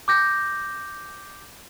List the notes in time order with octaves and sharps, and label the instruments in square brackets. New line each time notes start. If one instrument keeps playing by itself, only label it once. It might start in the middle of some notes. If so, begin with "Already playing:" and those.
[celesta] D6 G6 A#6